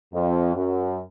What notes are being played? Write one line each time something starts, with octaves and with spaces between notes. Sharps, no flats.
F2
F#2